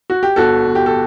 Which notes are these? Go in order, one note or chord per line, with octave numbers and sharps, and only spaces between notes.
F#4
G4
G1 F#4 A4
G1
G4
A4